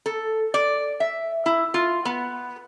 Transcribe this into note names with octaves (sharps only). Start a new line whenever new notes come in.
A4
D5
E5
E4
F4
B3